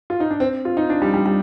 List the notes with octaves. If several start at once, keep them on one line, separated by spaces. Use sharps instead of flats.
F4
D#4
D4
C4
F4
D#4
D4
G3
G3
G3